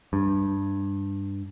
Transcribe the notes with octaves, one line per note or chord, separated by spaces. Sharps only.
G2